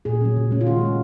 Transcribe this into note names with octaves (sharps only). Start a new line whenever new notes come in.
A#2 G#4
F#3 C#4
C#3
G#3 C#4
F4
D#3 F#4
G#3 C#4